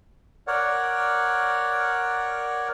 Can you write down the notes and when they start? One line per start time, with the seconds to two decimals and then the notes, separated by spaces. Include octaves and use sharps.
0.47 A#4 C#5 D5 F#5